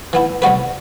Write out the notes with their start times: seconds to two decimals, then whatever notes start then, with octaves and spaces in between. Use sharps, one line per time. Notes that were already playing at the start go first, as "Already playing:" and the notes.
0.13 E3 B3 E4
0.42 C3 G3 B3 F#4 B4